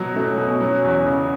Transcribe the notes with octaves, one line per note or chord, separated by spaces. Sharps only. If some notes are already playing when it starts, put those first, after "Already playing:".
Already playing: B2 F#3
A3 C#4
B2
F#3
E2
C#3